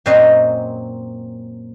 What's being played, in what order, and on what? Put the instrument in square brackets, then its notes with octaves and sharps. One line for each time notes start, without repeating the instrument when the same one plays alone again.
[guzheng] F#2 A#2 C4 F#4 C5 D#5